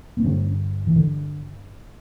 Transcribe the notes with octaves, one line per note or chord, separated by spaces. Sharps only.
B3
G2 D3 C#4
E3
D3